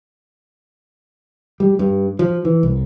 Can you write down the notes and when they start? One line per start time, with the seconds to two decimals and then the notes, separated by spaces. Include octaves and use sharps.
1.60 G3
1.79 G2
2.19 F3
2.45 E3
2.63 C2